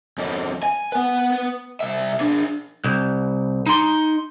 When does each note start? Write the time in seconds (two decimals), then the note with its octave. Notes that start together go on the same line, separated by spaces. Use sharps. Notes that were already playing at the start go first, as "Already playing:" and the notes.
0.18 F2 C#4
0.63 G#5
0.92 B3 B4
1.80 C2 E5
2.21 D4 G#4
2.84 C2
3.66 D#4 C6